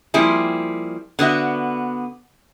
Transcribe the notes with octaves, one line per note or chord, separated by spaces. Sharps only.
F3 G3 A#3 C4 E4 G#4
D3 B3 F#4 E5